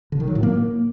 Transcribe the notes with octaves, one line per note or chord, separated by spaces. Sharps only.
D3
D#3
F#3
A2
A#3